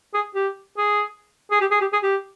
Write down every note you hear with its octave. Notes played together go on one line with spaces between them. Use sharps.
G#4
G4
G#4
G#4
G4
G#4
G4
G#4
G4